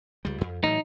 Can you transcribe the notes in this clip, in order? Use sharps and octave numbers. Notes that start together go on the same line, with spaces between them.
C#2 G3
F2
A2 E3 F#3 D#4